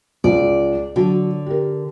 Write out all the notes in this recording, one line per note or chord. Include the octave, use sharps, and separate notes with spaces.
C#2 D5
D3 F#3
G4 A#4